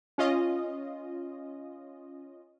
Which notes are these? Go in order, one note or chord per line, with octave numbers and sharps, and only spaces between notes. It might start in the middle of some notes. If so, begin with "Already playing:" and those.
C#4 F4 D#5